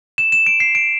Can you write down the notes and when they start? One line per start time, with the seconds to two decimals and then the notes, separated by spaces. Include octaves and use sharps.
0.18 E7
0.32 E7
0.46 D7
0.60 C7
0.75 D7